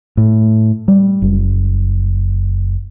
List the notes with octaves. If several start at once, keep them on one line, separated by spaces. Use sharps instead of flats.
A2
G3
F#1